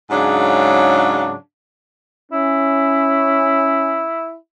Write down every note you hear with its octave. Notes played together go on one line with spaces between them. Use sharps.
G#2 C#3 F#3 D4
C#4 E4